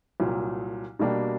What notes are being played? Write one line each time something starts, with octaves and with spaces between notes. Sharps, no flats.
C2 A#2 F#3
B2 G3 A#3 D4 G4